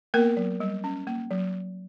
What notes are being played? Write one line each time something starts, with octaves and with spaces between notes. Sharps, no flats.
A#3 B3 A#4
F#3
G3
C#4
A#3
F#3